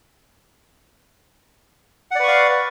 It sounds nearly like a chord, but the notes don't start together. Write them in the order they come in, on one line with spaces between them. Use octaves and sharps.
F#5 D5 B4 C#6 F5